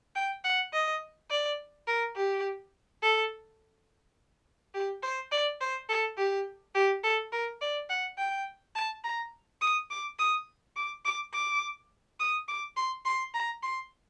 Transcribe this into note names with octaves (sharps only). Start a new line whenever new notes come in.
G5
F#5
D#5
D5
A#4
G4
A4
G4
C5
D5
C5
A4
G4
G4
A4
A#4
D5
F#5
G5
A5
A#5
D#6
D6
D#6
D6
D6
D6
D#6
D6
C6
C6
A#5
C6